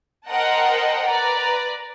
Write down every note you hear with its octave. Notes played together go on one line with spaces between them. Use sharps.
A#4 C5 D#5 F#5 G5 A5
B4 D5 A#5